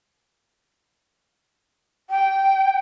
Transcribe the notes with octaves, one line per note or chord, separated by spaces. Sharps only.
G5